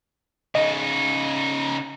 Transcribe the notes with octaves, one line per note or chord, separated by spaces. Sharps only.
C#3 D#4 D#5